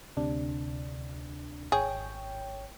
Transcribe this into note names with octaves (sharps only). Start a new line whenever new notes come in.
D2 C3 D4
G#1 G#4 C#5 G5